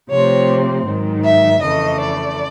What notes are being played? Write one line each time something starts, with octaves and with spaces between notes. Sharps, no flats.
C3 F3 A3 C4 C#5
G#2 D#3 F#3
E5
F2 C#3 E3 A3 D#5
D5